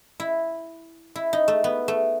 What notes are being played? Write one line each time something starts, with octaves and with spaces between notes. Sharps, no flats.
E4
E4
D#4
A3
B3
A3